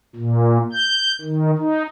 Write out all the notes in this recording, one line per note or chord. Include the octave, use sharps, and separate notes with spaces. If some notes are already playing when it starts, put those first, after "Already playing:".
A#2
G6
D#3
D#4